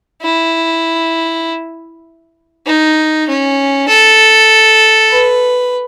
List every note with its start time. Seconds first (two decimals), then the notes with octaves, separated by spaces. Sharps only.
0.22 E4
2.66 D#4
3.28 C#4
3.88 A4
5.11 B4